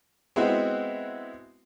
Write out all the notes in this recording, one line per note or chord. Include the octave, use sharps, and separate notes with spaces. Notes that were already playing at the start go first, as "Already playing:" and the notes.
G#3 B3 C4 E4 F#4